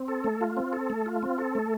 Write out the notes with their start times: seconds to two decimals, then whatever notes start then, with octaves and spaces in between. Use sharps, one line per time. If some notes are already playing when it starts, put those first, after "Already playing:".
Already playing: C4
0.08 A4
0.24 A3
0.41 F4
0.57 C4
0.73 A4
0.90 A3
1.06 F4
1.23 C4
1.38 A4
1.55 A3